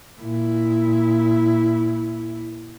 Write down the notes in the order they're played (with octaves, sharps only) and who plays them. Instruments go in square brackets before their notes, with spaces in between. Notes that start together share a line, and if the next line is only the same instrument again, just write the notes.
[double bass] A#2 E4